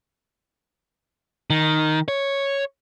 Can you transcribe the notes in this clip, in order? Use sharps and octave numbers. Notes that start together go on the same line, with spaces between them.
D#3
C#5